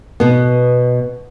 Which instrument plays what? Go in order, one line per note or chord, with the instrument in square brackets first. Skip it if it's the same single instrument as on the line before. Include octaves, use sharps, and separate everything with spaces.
[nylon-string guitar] B2 B3